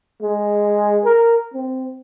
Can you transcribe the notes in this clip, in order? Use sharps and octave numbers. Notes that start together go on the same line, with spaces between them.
G#3
A#4
C4